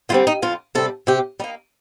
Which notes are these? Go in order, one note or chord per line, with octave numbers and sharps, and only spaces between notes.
D3 G3 C4 F4
D#4
F2 F4
C3 G3 A4
C3 G4
G3 A#3 D#4